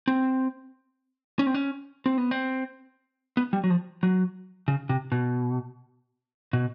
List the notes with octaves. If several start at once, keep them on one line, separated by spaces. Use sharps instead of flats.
C4
C#4
C4
C#4
C4
B3
C4
B3
G3
F#3
F3
F#3
C#3
C3
B2
B2